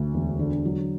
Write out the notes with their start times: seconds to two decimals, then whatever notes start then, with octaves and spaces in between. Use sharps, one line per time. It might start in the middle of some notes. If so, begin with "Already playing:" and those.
Already playing: D2
0.14 E1
0.39 D3
0.65 F#3